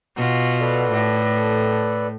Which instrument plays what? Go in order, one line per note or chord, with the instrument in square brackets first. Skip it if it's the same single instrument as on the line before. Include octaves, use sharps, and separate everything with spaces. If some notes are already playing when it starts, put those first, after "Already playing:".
[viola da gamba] B2 F4 F#4
[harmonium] A4 B4 D5
[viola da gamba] A2